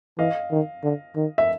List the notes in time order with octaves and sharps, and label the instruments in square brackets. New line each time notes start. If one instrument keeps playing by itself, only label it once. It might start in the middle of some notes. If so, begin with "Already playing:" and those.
[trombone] E3 [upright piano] D#5 F5
[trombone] D#3
D3
D#3
[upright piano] E5